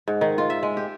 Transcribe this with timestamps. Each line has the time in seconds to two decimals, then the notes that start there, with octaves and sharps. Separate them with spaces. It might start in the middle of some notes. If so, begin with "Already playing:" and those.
0.08 G#2
0.21 D#3
0.38 F4
0.50 E5
0.63 G#3
0.77 G4